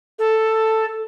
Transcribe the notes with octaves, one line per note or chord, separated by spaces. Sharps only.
A4